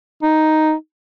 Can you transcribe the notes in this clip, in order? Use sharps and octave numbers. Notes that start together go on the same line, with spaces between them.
D#4